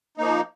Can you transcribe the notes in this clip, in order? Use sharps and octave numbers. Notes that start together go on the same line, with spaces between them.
F3 A#3 D#4